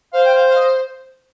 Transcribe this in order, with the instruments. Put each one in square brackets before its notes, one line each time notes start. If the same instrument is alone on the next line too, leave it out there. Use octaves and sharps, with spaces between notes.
[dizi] C5 [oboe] F5
[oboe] G5
F5
F5
D#5